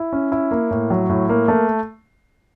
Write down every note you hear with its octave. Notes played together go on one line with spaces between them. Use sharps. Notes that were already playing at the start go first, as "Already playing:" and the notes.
Already playing: E4
C#4
E4
A#3
A2
F#3
A2
A#3
A3